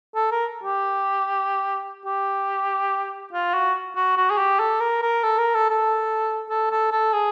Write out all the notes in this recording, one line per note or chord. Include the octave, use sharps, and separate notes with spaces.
A4
A#4
G4
G4
F4
F#4
F#4
F#4
G#4
G4
A4
A#4
A#4
A4
A#4
A4
A4
A4
A4
A4
G#4